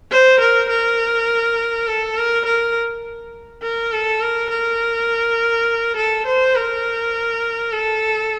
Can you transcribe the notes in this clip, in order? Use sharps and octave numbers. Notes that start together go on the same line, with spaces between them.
C5
A#4
A#4
A4
A#4
A#4
A#4
A4
A#4
A#4
A4
C5
A#4
A4